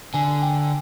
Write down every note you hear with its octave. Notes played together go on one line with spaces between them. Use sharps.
D3 G#5
G5